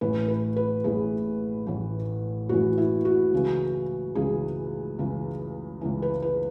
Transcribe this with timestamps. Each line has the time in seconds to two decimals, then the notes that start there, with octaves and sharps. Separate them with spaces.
0.01 A1 A2 E3 B4
0.28 B4
0.56 B4
0.84 A1 A2 E3 G#4
1.66 A1 A2 E3
2.49 A1 A2 E3 F#4
2.78 E4
3.05 F#4
3.32 C#2 C#3 E3
4.15 C#2 C#3 E3 G#4
4.99 C#2 C#3 E3
5.81 C#2 C#3 E3
6.02 B4
6.22 B4